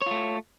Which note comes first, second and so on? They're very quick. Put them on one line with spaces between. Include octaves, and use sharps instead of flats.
C#5 F4 A3